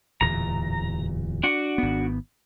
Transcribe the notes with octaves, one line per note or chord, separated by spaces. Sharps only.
D1 E2 A#2 A#5
D4 F#4 F#5
G#1 B3